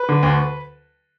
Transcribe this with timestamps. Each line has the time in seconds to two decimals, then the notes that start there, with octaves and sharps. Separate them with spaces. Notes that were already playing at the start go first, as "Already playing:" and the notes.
Already playing: B4
0.09 D3
0.23 D2